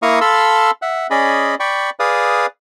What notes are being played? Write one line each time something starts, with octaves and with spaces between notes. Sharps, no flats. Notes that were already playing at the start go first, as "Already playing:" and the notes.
A#3 E4 F5 A#5 C#6 D#6
A4 F5 A5 B5 C6 E6
E5 F#5
C#4 G#4 D5 D#5 B5
D5 G5 B5 C#6
G#4 B4 D5 F5 D#6